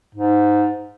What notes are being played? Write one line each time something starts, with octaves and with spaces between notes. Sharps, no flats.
G#2